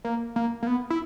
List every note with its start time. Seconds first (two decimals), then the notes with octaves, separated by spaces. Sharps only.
0.05 A#3
0.36 A#3
0.63 A#3
0.67 B3
0.90 E4